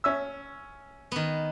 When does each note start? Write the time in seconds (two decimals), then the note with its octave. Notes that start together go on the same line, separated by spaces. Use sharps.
0.04 C#4 E5 E6
1.12 D#3 B3